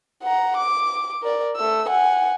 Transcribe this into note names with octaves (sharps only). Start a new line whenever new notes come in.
F#5 A#5
D6
A#4 D5
A3 E6
F#5 G#5